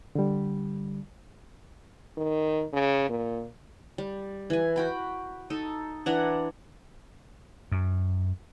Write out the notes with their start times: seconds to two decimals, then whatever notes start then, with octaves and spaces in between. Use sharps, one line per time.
0.15 D3 G3
2.17 D#3
2.73 C#3
3.09 A#2
3.98 G3
4.50 E3 G#5
4.76 F#4 G5 B5
5.50 D#4 A4
6.06 E3 D4 F#5 A#5
7.72 F#2